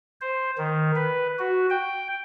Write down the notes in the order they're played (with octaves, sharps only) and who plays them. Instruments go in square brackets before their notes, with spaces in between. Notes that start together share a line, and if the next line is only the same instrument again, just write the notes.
[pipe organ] C5
D#3
B4
F#4
G5